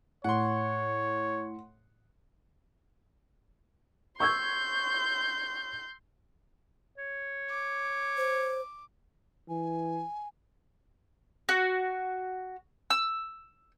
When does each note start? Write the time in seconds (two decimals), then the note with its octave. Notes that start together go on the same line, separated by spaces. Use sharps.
0.24 A2 C#5 F#5 C6
4.20 C6 C#6 E6 G6 G#6
6.98 C#5
7.49 D6
8.17 C5
9.49 E3 G#5
11.49 F#4
12.90 E6